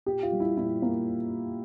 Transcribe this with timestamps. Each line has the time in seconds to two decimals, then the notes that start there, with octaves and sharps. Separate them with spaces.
0.06 A#2 G4
0.23 F4
0.32 G3
0.40 E4
0.57 A#2 E4
0.82 A#3